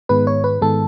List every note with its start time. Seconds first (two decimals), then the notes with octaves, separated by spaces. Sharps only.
0.09 G#2 D#3 G#3 B3 B4
0.27 C#5
0.44 B4
0.61 G#2 D#3 G#3 B3 A4